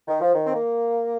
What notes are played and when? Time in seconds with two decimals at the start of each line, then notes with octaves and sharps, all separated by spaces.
0.08 D#3
0.21 F3
0.35 D#3
0.45 C4
0.53 A#3